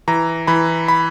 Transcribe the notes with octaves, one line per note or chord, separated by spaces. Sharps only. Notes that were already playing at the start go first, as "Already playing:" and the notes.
E3 A#5
E3 B5
B5